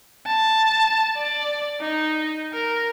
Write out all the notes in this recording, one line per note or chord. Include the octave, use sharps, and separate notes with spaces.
A5
D5
D#4
A#4